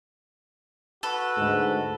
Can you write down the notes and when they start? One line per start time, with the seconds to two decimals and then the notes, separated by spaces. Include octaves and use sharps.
1.03 F#4 A4 B4
1.37 D2 G#2